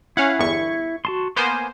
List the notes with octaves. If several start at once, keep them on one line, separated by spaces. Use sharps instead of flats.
C#4 E4 F5 F#5
G1 E2 C#6
F#4 A5 C6
A#3 B3 C5 G#5 C6